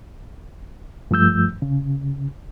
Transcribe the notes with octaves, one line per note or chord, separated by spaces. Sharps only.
G2 F3 A3 E6 G6
C#3